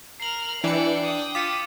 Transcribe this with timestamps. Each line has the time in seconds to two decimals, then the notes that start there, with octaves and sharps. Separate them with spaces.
0.20 A#4 F6 C7 F#7
0.64 E3 D4 G5 C#7
1.03 G5 D#6
1.35 F4 D6 B6 C#7